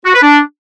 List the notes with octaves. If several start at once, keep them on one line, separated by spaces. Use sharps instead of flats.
F#4
B4
D4